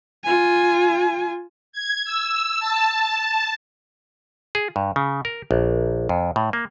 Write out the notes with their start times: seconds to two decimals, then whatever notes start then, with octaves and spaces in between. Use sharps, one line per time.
0.24 F4 G#5
1.72 G#6
2.05 E6
2.60 A5
4.55 G#4
4.76 G2
4.96 C#3
5.25 A#4
5.51 A#1
6.09 F2
6.36 A2
6.53 A#3